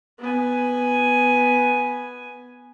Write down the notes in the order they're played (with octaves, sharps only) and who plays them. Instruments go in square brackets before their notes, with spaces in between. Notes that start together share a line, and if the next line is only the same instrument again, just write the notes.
[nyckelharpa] B3 G#5